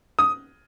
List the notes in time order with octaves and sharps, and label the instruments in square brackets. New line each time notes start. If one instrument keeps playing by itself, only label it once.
[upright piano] D#6